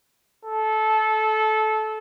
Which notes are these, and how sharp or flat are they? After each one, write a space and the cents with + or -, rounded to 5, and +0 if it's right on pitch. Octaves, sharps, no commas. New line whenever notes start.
A4 -20